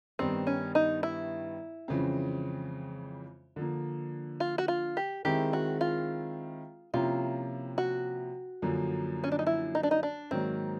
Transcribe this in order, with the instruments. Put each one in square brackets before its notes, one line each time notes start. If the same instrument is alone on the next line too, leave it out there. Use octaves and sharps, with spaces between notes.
[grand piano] G2 D#3 G3 B3 [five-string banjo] C4
[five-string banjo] C#4
D#4
E4
[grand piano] F2 C#3 E3 G#3 C4
D3 F3 A#3
[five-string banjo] F4
F#4
F4
G4
[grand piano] D#3 G#3 C4 E4 G#4 [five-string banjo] G4
[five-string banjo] F#4
F4
[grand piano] C3 F3 A#3 C#4 E4 [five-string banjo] F4
[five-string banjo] F#4
[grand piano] F#2 D3 F3 A#3
[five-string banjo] C#4
D4
D#4
E4
D#4
D4
D#4
D4
[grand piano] G#2 D#3 F#3 A#3 [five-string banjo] C4